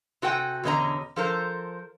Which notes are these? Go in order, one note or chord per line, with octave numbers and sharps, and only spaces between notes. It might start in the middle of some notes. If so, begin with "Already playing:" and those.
C3 F#4 A4 G5 G#5
E2 B2 D3 C#4 D#5 A#5
F3 A4 A#4 C5